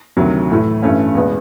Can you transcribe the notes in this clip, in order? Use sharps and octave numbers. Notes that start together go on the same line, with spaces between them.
D2 C3 D#3 F#3
A2 E3 A3
G2 E3 A3 C#4
E2 B2 G#3 B3